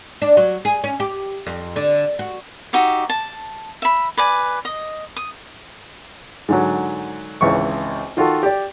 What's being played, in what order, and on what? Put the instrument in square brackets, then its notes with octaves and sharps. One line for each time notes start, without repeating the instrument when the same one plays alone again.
[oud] D4
F#3
G#4
C#4
G4
F2
D3
F#4
[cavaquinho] D#4 F#4 G4 E5
A5
E5 B5
B4 D5 G#5
D#5
D#6
[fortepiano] G#2 D3 F#3
G#1 C#2 E3 C#6
D#3 F4 F#4 A4
G4 D5